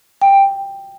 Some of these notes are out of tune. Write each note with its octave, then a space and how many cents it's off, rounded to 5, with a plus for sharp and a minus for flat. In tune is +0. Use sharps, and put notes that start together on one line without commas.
G5 +10